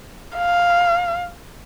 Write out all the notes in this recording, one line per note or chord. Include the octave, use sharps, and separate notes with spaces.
F5